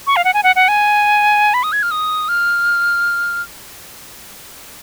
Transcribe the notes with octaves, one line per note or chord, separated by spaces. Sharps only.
C#6
F5
F#5
G#5
F#5
F#5
G#5
B5
D#6
G#6
F6
D#6
F6